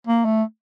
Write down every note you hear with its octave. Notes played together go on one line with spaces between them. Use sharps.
A#3
A3